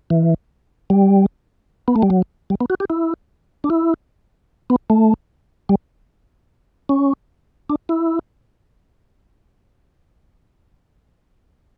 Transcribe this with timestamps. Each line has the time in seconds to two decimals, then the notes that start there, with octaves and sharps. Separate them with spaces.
0.10 E3
0.90 G3
1.88 B3
1.96 A3
2.02 G3
2.10 F#3
2.50 G3
2.61 B3
2.70 F#4
2.80 G4
2.90 E4
3.64 D4
3.70 E4
4.70 B3
4.90 A3
5.69 G3
6.89 C#4
7.70 D4
7.89 E4